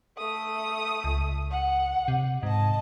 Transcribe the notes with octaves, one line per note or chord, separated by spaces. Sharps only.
A3 D#6
C#2
F#5
C3
G#2 D#5 A5